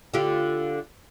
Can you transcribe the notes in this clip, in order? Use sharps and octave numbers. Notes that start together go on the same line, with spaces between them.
D3 F4 G4